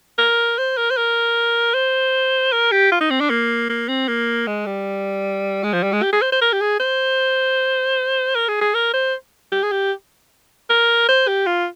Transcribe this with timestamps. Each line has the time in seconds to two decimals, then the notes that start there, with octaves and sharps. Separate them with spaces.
0.19 A#4
0.58 C5
0.77 A#4
0.90 C5
0.97 A#4
1.74 C5
2.52 A#4
2.72 G4
2.92 F4
3.01 D#4
3.11 C4
3.21 D4
3.30 A#3
3.69 A#3
3.88 C4
4.08 A#3
4.47 G#3
4.66 G3
5.63 G#3
5.73 F3
5.83 G3
5.93 G#3
6.03 G4
6.13 G#4
6.22 C5
6.32 C5
6.41 A#4
6.53 G4
6.61 G#4
6.80 C5
8.35 A#4
8.48 G#4
8.61 G#4
8.75 A#4
8.94 C5
9.52 G4
9.63 G#4
9.72 G4
10.70 A#4
11.08 C5
11.28 G4
11.46 F4